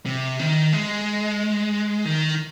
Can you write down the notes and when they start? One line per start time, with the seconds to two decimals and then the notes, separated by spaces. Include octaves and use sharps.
0.06 C3
0.39 D#3
0.73 G#3
2.05 D#3